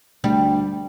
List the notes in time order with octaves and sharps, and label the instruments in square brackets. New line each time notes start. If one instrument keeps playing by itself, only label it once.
[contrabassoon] D2 [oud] G3